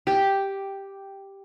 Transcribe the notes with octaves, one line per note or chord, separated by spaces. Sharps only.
G4